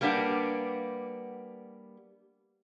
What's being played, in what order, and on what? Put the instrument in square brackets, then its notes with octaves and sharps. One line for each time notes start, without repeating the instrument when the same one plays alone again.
[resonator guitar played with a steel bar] G3 A#3 B3 D4 G4 F#5